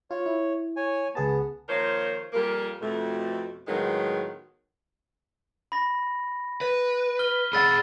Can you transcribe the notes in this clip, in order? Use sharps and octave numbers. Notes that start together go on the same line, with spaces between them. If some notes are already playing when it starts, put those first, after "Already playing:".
F4 C#5
E4
C#5 G#5
C#2 B3 G#4 A5
D#3 F3 A#3 A#4 C5 C#5
F2 A#2 G3 A#3 A#4
F2 B2 A3
A2 D#3 F#3 G#3 B3 F4
B5 A#6
B4
F6 G7
G#4 D5 F#5 B5 E6 A6